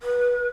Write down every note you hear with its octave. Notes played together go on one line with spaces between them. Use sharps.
B4